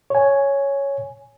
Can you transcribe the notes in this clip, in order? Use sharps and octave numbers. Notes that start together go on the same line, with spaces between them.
C#5 G#5